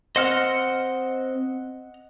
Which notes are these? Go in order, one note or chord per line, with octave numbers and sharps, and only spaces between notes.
C4 C5 D#5 F#5 F6